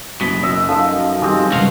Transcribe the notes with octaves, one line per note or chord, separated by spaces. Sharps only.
F#1 F#2 B2 B6
F#2 D#5 E5
F3 D#4 A4 D#5
D#3 G3 G#3 C4 D6
E1 G2 C#3 F#4 F5